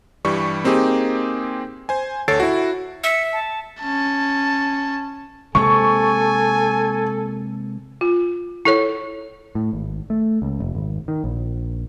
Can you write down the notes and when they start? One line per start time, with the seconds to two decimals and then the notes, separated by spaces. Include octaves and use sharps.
0.25 G2 E3 G3 C#6
0.64 A#3 C4 D#4 G4 G#4
1.89 C5 G#5
2.28 D2 A4 C#5 A6 C7 D7
2.40 E4 F#4
3.04 E5 C#7
3.33 A5
3.81 C#4 A5
5.55 C3 G#3 A#3 A4 G#5 C#6
8.01 F4
8.65 E4 A4 C#5
9.55 A2
9.73 G#1
10.10 A3
10.42 C#2
10.60 F1
10.75 G#1
11.08 D#3
11.24 A#1